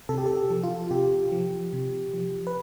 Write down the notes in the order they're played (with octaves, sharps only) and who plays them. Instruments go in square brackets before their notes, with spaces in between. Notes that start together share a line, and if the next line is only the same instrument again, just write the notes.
[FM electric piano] C3 A4
G4
A4
G4
F3
F4
C3 G4
F3
C3
F3
B4